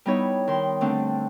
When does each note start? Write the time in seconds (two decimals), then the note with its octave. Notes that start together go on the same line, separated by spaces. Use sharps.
0.06 G3 B3 D#4 E4 C#5
0.48 D#3 C6
0.81 D3 A3 C4 D4